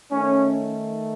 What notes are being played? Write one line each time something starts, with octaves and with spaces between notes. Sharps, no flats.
D#3 A3 C#4